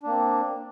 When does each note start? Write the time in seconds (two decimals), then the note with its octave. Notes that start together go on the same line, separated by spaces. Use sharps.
0.03 D4
0.07 A#3
0.10 C4